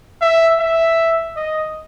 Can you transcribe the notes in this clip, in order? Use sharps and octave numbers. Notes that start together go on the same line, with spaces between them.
E5
E5
D#5